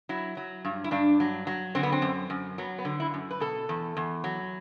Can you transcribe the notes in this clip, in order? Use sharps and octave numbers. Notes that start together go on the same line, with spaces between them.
F#3 E4
F#3
G2
E4
G2 D4
F#3
F#3
D3 C4
B3
C4
F#2
F#2
F#3 B3
B3
D3
E4
F#2
B4
B2 A4
E2
E2
F#3